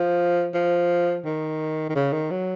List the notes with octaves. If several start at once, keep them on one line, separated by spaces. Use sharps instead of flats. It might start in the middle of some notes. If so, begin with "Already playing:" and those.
Already playing: F3
F3
D#3
D#3
C#3
D#3
F#3